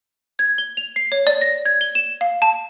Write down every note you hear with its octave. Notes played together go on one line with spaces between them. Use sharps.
G#6
G7
F7
C7
C#5
D5
A#6
G#6
G7
E7
F5
A5